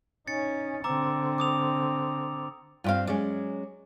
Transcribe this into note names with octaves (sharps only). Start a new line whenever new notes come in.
C#4 D#4 A6 C#7
D3 C4 A#5 D6 E6
D6 D#6 F7
G2 C4 F4 G4 F5
F#3 G#3 C#4 D5